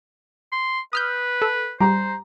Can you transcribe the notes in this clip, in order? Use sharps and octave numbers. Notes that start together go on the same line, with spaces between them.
C6
B4 D#6 F6 G6
A4
G3 G4 C5 A#5